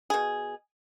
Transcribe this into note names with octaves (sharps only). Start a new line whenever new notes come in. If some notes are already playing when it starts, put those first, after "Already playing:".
B2 G#4